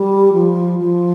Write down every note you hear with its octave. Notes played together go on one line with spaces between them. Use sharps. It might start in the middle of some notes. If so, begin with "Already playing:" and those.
Already playing: G3
F3
F3